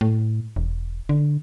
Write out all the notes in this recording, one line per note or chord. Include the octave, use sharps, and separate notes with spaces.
A2
E1
D3